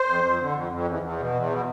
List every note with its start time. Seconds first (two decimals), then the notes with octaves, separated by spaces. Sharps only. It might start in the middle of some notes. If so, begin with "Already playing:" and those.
Already playing: C5
0.08 F2
0.24 F2
0.39 D3
0.55 F2
0.72 F2
0.87 E2
1.02 E2
1.19 B2
1.35 E2
1.50 B2